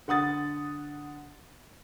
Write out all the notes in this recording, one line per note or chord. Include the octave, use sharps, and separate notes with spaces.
D3 F#5 D#6 A6